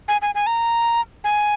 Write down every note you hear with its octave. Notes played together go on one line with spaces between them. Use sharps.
G#5
G#5
G#5
A#5
G#5